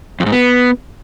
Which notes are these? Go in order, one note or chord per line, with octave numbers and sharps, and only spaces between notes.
F2
G#2
B3